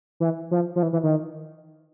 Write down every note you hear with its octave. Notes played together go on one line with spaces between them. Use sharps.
E3
F3
F3
E3
E3
D#3